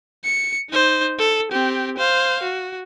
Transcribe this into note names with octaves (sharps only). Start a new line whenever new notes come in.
C#7
D#4 C5
A4
C4 G4
C5 F5
F#4